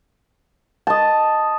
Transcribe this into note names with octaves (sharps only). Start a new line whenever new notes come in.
D#5 A5